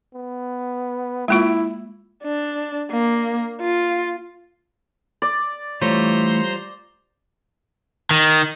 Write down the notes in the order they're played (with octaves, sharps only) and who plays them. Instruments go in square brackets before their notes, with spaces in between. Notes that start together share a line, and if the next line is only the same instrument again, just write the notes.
[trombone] B3
[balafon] G#3 A#3 F4 [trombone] E4
[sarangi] D4
A#3
F4
[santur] D5
[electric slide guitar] E3 A3 [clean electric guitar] G3 F4 C#5 [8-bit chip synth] C5 A#5 C6
[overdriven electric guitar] D#3